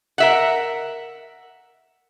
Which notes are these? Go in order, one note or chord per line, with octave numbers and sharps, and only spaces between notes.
A#4 E5 F#5